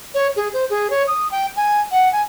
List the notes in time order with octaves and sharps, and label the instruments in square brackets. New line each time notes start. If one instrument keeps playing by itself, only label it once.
[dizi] C#5
G#4
C5
G#4
C#5
D#6
G5
G#5
F#5
G#5